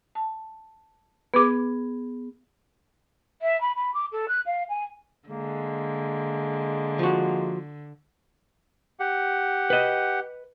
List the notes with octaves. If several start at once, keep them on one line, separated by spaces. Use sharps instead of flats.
A5
B3 G#4 B4 D6
E5
B5
B5
D6
A4
F#6
F5
G#5
D3 G#3 A#3
F3 F#4
G4 F#5
B4 D#5